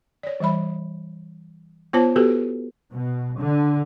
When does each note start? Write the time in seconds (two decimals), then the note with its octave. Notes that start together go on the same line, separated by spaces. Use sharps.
0.23 C#5 D5
0.40 E3 G3 E5 B5
1.93 B3 F4 C5 C#5 A5
2.16 B3 F#4 G4 A4 B4
2.92 B2
3.39 D3